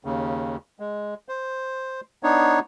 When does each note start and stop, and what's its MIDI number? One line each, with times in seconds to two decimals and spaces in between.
0.05 0.57 39
0.05 0.57 49
0.80 1.14 56
1.29 2.01 72
2.23 2.59 59
2.23 2.59 62
2.23 2.59 63
2.23 2.59 73